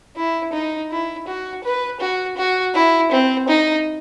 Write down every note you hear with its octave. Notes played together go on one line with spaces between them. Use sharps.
E4
D#4
E4
F#4
B4
F#4
F#4
E4
C4
D#4